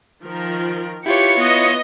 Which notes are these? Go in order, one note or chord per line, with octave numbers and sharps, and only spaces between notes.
D#3 F3 A#4
E4 F4 G4 B4 C#5 C#7
B3 D#5